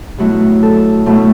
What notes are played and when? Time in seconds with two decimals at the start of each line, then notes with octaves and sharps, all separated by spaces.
0.18 B2 F#3 A3 E4 F#4
0.63 A4
1.06 B2 F#3 A3 E4